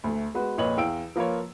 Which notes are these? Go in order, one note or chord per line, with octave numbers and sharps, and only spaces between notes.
D2 A3
G#3 B3 F#4 B4
F2 A#2 B4 C#5 D#5 F#7
E2 F5 G5 E6 D7
F3 A#3 F4 B4 C#5